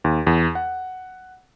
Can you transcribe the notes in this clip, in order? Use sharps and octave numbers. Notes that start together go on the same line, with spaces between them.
D#2
E2
F#5